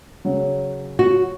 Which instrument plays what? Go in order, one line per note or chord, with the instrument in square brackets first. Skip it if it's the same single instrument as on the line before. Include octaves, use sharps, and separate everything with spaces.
[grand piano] C#3 F#3
[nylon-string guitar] F#4